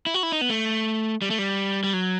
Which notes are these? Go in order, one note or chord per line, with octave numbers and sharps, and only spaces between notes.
E4
F#4
E4
D#4
B3
A3
G3
A3
G3
G3
F#3